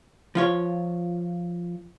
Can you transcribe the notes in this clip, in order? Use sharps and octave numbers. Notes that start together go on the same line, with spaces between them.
F3 F4 C#5